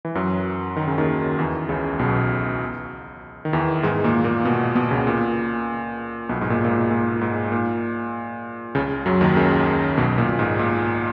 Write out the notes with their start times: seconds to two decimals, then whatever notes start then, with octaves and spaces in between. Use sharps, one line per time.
0.05 E3
0.15 F#2 F#3
0.76 D#3
0.88 C#3
0.98 D#2 D#3
1.38 E2 E3
1.69 C#2 C#3
1.99 B1 B2
3.45 D#3
3.53 E2 E3
3.83 G#2 G#3
4.04 A#2 A#3
4.24 A#2 A#3
4.45 B2 B3
4.75 B2 B3
4.91 C#2 C#3
5.07 A#2
6.29 B1 B2
6.41 G#2
6.50 A#2
6.65 A#2
6.70 G#2
6.91 A#2
7.21 G#2
7.52 A#2
8.75 C#2 C#3
9.06 F#2 F#3
9.21 D#2 D#3
9.36 C#2 C#3
9.97 B1 B2
10.18 A#2
10.30 A#2
10.39 G#2
10.59 A#2